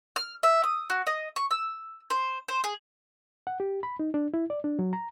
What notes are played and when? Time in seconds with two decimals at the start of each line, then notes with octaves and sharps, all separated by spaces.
0.16 F6
0.43 E5
0.64 D#6
0.90 F#4
1.07 D#5
1.36 C#6
1.51 E6
2.10 C5
2.48 C5
2.64 G#4
3.47 F#5
3.60 G4
3.83 B5
3.99 D#4
4.14 D4
4.34 E4
4.50 D5
4.64 D4
4.79 F#3
4.93 A#5